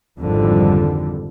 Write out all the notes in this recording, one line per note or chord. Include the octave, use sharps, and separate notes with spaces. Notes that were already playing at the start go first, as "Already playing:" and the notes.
G#1 F2 D3 G3